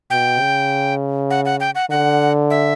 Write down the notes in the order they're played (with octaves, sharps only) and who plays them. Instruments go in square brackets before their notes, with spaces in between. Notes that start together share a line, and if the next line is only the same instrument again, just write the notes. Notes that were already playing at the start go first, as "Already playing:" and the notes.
[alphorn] B2 [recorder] G5
[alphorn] C#3
[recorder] F#5
F#5
G5
F#5
[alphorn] D3 [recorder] F#5
[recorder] E5